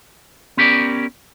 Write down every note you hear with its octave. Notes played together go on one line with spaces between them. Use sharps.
B3 C#4 G4 A#4 D5